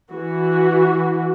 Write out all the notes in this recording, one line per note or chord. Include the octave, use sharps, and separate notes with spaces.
E3 F#4